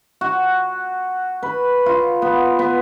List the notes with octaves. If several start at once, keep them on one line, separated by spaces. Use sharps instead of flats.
F#4
B4
F4
B3
B3